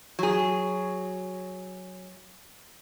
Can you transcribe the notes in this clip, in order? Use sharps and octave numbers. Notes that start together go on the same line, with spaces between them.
F#3 G#4